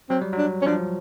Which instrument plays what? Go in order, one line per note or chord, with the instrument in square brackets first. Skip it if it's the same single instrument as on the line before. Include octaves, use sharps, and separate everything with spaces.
[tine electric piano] F#3 [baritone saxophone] C4
[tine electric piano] G3
F#3
[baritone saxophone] D4
C#4
[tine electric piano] F3 [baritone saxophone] D4